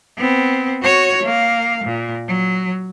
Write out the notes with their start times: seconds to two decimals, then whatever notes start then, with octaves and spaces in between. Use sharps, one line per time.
0.18 B3 C4
0.83 F#4 C#5
1.23 A#3 F5
1.84 A#2
2.28 F#3